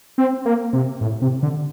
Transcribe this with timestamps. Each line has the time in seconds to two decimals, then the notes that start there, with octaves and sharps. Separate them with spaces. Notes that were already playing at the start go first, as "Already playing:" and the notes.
0.18 C4
0.45 A#3
0.73 C3
1.01 A2
1.22 C3
1.43 D3